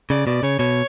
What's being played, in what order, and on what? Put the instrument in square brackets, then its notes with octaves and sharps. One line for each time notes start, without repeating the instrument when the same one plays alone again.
[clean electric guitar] C#3 [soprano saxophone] D5
[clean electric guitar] B2 [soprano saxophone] D5
[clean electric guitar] C#3 [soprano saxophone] C#5
[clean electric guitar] B2 [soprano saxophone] C#5